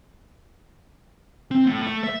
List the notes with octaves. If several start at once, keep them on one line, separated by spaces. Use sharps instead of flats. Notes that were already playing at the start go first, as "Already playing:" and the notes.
C4
A2
A3
E5